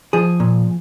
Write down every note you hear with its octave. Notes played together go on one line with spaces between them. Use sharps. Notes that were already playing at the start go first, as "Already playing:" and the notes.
F3 G#4
A#2